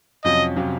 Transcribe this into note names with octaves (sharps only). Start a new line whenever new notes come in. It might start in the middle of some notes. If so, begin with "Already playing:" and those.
F2 C3 F#3 C#4 F4 D#5
C3 F#3 C#4 F4